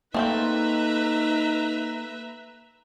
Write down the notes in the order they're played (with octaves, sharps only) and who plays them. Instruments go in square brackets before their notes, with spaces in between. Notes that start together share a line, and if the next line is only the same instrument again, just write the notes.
[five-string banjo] A3 C4 G5 [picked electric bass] A#3 [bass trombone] D#4 [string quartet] B4 E5 A#5